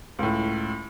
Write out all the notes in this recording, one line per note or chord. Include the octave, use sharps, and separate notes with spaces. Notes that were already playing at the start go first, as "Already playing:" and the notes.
C#2 A2